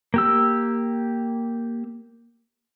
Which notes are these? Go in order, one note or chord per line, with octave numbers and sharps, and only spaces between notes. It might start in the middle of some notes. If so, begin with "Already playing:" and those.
A#3 G4 E6